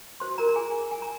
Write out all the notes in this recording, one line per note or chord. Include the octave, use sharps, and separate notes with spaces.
F#4 C5 C6
A#4 A#5
A#5
G#4 G#5
G#5
A#5